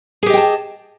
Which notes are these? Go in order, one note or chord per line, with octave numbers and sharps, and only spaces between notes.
G4 G#4 D#5 G5 A5